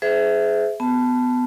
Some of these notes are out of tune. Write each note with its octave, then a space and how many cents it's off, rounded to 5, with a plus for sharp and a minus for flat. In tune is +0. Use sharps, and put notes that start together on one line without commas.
G#4 +20 C5 -35 E5 +0
B3 +15 A5 +0